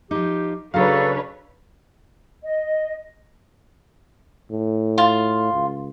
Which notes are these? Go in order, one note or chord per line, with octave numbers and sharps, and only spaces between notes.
F3 D#4 G4
C#3 F#3 D4 A4 B4 C#5 F5 A#5
D#5
A2
F4
C#2